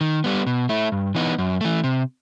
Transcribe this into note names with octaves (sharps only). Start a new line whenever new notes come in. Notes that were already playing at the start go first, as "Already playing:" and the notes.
D#3
G3 B3
B2
A3 E4
G2
E3 B3 D#4
F#2
E3 A3
C3